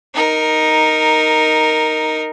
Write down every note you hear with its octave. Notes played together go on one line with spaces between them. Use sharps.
D#4 A#4